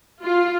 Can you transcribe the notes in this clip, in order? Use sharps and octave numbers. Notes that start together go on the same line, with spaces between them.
F4